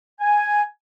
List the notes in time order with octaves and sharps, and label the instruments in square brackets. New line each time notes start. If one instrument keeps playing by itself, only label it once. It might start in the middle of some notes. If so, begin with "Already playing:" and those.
[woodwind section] G#5